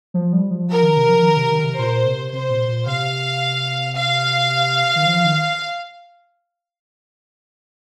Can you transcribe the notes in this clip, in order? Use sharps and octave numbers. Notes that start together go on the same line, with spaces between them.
F3
G3
F3
F3 A#4
D#3
C3
F3
D#3
C3
D#3
C3
A#2 C5
C3
C3 C5
A#2
A#2
C3 F5
F5
D#3
F3
D#3